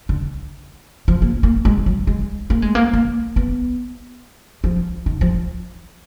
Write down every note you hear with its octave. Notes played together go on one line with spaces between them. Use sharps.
D3
F3
A#3
A#3
G#3
F#3
G#3
A#3
G#3
A#3
A#3
B3
F3
D#3
F3